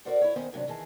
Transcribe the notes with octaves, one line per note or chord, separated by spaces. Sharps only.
F#4 A4 A#4 C5 D5 F#5
E4 C#5
D#3 B3 C#4 C5 D#5
D2 G2 C3 D#3 F#3 D4
D#3 E3 G#4 A5